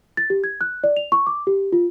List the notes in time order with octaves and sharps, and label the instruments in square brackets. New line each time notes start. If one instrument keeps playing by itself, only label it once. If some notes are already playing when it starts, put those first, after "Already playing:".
[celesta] A6
G4
G#6
F#6
D5
F7
C#6
D6
G4
F4